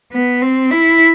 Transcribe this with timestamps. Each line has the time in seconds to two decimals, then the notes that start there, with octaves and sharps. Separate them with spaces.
0.12 B3
0.42 C4
0.71 E4